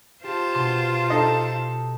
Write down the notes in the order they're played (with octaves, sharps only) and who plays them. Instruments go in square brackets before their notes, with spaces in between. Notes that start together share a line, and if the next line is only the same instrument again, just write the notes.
[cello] F4 [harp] G4 [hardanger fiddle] C5 A5
[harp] B2 [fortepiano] C6
[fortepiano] D#4 A4 D#5